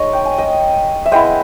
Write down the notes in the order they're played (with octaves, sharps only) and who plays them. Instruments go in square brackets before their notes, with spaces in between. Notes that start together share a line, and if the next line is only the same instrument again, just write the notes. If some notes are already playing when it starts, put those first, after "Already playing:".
Already playing: [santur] G#3 D#4 C#5 D#5
G5
G#5
D#5 G5
E5
G#3 B3 E4 D#5 G5